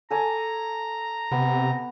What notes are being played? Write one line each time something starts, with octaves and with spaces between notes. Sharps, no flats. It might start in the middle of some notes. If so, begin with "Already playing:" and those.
A4 G#5 A#5 D6
C3 B3